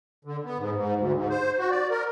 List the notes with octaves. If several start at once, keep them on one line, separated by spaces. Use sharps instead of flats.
D3
B3
G#2
G#2
D2
G#2
C5
F#4
D5
A#4